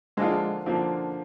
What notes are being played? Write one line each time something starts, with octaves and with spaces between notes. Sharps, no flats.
D3 F3 G#3 A#3 D4 F4
D3 F3 A#3 D4 F4